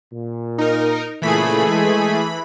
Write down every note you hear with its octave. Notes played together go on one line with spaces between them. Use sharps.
A#2
D#4 A#4
A#2 C#3 E3 A3 G#4 B5
G#3